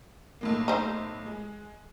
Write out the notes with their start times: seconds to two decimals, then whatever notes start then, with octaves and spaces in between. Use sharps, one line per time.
0.41 B1 A2 A#3
0.68 D#4 C5
1.26 G#3